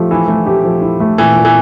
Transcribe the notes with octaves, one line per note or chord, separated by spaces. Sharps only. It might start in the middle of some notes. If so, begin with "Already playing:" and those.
Already playing: F3 A3 G4
E3 E4
A3
G4
F3
E4
A3
A#2 E3
A#2
E3